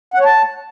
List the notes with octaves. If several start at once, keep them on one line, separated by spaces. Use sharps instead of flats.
F#5
C#5
A5